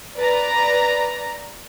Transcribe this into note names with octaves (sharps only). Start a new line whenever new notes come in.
B4 D5 A#5